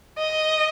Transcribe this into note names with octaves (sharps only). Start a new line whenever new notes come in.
D#5